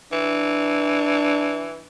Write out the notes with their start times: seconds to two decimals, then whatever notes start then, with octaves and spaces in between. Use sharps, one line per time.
0.12 E3 D4